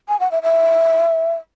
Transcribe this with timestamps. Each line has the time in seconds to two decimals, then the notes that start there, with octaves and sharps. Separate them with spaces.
0.08 G#5
0.20 F#5
0.31 E5
0.43 E5